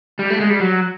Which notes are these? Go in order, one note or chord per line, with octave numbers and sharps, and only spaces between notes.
G3
A3
G#3
G3
F#3